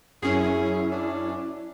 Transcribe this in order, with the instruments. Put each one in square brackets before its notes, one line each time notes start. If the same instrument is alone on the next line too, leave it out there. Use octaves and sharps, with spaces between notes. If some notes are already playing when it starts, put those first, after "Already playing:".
[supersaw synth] F#2 C#4 [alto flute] E4 [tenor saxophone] G#4
[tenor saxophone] D4